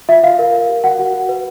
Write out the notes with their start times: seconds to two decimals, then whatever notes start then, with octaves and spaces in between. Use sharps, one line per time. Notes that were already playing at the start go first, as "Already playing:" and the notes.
0.09 F4 E5
0.23 F4 F5
0.39 A#4
0.54 A#4
0.69 G4
0.84 F#4 F#5
0.99 F#4
1.14 F#4
1.29 B4